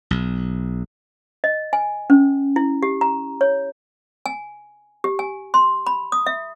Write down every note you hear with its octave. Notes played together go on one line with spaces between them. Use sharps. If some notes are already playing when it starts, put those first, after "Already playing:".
B1
D#5
G#5
C#4
E4
G4
A#5
C#5
G#5
G4
G#5
C6
B5
D#6
E5